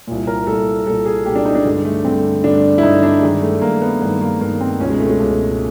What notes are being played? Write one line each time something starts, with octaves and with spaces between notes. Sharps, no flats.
C2 A#2
A#4
C2 A#2 A4
C2 A#2 A4
G#4
C2 A#2 G4
D4
D#4
D4
G2 D3 G#3
A3
G2 D3 C4
G2 D3 D4
E4
G2 D3 D#4
D4
G2 D#3 G#3
A3
G2 D#3 A#3
B3
G2 D#3 B3
A#3
G2 D#3 A#3
C4
C#2 B2 C#4
G#3
A3
G#3
C#2 B2